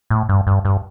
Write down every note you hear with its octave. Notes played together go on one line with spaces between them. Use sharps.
A2
G2
G2
G2